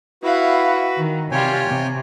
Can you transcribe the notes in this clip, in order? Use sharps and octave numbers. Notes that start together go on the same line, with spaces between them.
E4 F#4 B4 F5 F#5
D#3
C3 G3 F4 C#5 G5 G#5
C3